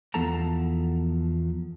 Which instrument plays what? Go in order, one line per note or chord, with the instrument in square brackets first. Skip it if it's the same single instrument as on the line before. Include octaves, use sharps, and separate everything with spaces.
[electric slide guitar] E2 F3 B3 A4 A5 A#5